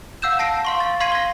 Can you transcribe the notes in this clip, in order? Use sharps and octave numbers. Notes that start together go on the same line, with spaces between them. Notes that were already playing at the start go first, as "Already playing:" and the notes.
F5 F#5 E6 G6 E7
A5 A#6 C7 D7
F5 C6 C#6
A6
F5 C6 G#6 C7 D#7
A#6 G7